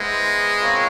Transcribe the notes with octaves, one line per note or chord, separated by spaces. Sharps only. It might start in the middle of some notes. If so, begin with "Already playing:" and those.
Already playing: G#3 B3 E4 G#4 C5 D#5
C4 F4 A#4 C#5 F5